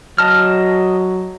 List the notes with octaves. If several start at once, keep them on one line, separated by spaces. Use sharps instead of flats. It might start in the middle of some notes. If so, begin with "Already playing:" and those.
F#3 D#5 A5 F6